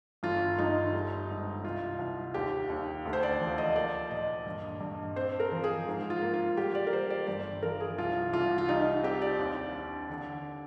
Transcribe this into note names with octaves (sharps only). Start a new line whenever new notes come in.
G1 F4
G1 D#4
G3
G#2
C2 F4
C2
D#2 G4
D#2
D2
C5
D5
F3
D#5
A#3 D5
A#2 D#5
G2
G2
C4 C5
A#4
F3
G#4
G#2
F4
A#3
F4
G3 G4
D5
A#4
G3 C5
D5
G1 D5
F3 A#4
G#4
C2 F4
C2 F4
F4
G3 D#4
C4 G4
D5
D#2
D4
D3